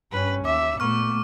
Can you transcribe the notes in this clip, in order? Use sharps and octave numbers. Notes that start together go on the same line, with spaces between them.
G2 C#4 B4
D#2 E5 D6
A#2 A3 B3 C#6 F6